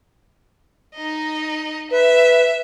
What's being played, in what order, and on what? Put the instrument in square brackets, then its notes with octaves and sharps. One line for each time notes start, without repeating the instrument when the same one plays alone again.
[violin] D#4 D#5
[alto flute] B4 [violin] E5